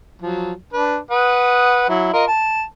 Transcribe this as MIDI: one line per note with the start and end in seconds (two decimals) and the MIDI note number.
0.22 0.53 53
0.22 0.53 54
0.73 0.97 62
0.73 0.97 71
1.11 1.85 71
1.11 1.85 78
1.11 1.85 87
1.89 2.10 54
1.89 2.10 64
2.13 2.25 65
2.13 2.25 70
2.13 2.25 75
2.27 2.64 81